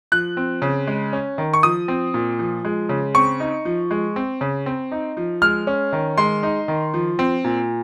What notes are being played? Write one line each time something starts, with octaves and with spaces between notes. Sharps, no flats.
F3 F#6
C4
C#3
G#3
C#4
D#3
C#6
F3 D#6
C4
A#2
F3
G#3
C#3
C4 C#6
D#4
F3
G#3
C4
C#3
C4
D#4
F3
G#3 F6
C#4
D#3
G#3 C6
D#4
D#3
F3
C4
A#2